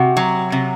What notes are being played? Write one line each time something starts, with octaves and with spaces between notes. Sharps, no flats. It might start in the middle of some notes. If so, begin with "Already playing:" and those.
Already playing: C3 F#4
F#3
C3